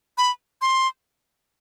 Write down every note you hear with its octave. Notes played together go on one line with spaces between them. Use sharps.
B5
C6